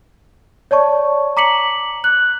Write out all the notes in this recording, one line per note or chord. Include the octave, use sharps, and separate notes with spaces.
C#5 D5 A5 C#6
A#5 D6 B6 C#7 F#7
F#6 F#7